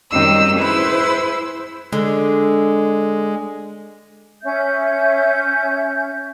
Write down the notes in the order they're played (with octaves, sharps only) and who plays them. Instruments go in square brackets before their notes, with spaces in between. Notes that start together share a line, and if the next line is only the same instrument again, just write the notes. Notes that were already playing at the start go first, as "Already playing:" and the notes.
[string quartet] F#2 D#3 G3 C4 D#5 E6
E4 G#4 B4 C5 B5 E6
[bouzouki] D3 [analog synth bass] G#3
[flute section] C#4 E5 G6